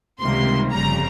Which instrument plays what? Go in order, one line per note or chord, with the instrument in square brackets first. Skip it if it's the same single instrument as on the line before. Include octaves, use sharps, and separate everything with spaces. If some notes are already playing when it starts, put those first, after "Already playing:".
[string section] C#2 C3 D#3 G3 A#3 C6
G1 F2 C#3 G3 A#5